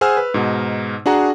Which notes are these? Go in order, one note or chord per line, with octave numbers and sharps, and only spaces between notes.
G#4 C5 F#5 G#5 E6 F6
B4
G#2 B2 D#4
D4 F#4 G#4 F#5 A#5